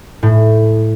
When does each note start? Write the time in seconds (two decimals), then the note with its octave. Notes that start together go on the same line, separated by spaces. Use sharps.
0.23 A2